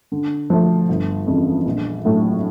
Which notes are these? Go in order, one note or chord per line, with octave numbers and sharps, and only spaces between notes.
D3
F3 A3
G1
F2 C#3 E3
A#1
A2 F#3 A3 D4